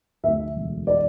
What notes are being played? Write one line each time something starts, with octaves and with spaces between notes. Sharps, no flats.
D2 E5
E1
D5